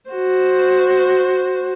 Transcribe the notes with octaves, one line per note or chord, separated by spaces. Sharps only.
F#4 C5